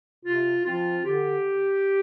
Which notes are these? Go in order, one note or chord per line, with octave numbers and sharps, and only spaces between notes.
C3 F4
F3 C4 F4
D3 G4